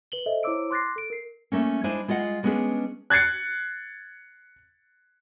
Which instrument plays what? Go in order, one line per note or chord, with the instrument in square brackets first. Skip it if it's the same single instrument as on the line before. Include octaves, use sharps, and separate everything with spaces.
[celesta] B4 F#7 G7
A4 C5 D#5 E5
E4 C5 C#5 D6 E6 D7
C6 D6 F#6 A6 A#6 C7
A4 D7
A#4 C7
[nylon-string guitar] A3 A#3 C#4
G#3 D4 E4 C5 G#5
G#3 F4 D#5 F#5
G3 G#3 B3 C#4 D4 G#4
[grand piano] F#6 G#6 A6 C7 C#7